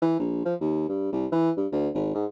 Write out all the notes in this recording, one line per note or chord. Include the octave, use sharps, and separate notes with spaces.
E3
A#1
F3
D#2
G2
C2
E3
G2
D2
G#1
G#2